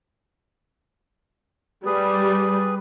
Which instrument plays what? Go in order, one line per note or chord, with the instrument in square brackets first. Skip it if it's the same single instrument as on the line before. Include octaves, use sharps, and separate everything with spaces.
[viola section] G3 [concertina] G#4 B4